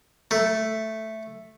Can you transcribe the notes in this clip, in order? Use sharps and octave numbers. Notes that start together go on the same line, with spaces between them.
A3